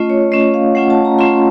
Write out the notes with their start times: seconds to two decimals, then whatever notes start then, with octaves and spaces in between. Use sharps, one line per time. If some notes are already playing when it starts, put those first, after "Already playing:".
Already playing: A3 C#4 F4 D#5
0.10 C#5
0.32 A3 C#4 F4 D#5
0.54 F5
0.75 A3 C#4 F4 F#5
0.90 A5
1.05 A#5
1.19 A3 C#4 F4 C6